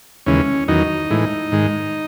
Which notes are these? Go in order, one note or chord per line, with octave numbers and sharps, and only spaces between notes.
D#2 C#3 E3 G#3 C#4
E2 D#3 F#3 D#4
A2 E3 G#3
G#2 D#3 G#3